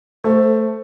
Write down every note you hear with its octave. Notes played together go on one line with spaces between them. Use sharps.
A3 C5